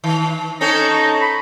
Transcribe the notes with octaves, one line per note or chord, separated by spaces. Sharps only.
D#3
C4 C#4 D#4 A4
B5